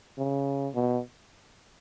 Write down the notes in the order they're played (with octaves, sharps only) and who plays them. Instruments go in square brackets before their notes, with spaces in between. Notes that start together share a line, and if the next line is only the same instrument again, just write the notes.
[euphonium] C#3
B2